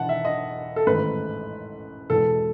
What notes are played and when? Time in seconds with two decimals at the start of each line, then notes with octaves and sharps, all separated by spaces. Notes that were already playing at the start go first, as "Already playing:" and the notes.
Already playing: E1 E2 D#3 F#5 A5
0.09 E5
0.25 D#5
0.76 A4
0.86 A1 G#2 D#3 A3 B4
2.10 E2 B2 G#3 A4